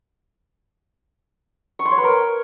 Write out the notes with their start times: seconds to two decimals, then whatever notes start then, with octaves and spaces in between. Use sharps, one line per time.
1.79 C#6
1.85 C6
1.92 C#5
1.98 B4
2.04 A#4